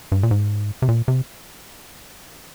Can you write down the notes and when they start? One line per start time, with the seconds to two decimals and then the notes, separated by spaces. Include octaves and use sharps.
0.12 G2
0.23 A#2
0.31 G#2
0.82 C3
0.89 A#2
1.08 C3